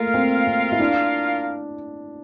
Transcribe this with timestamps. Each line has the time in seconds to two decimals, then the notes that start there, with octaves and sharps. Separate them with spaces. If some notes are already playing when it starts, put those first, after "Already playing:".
Already playing: A3 A#3 F4 A#4 F5
0.14 C4
0.47 C4
0.72 E4
0.80 D4